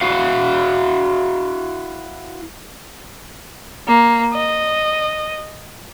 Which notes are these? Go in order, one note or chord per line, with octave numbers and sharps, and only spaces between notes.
E4 F#4 F5
A#3
D#5